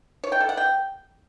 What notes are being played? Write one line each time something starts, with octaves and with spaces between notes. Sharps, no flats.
C#5
G5
A4
F#5
G5